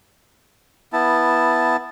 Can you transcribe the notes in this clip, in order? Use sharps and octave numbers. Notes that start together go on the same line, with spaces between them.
B3 E4 A5